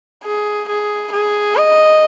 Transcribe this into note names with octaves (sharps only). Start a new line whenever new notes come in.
G#4
G#4
G#4
D#5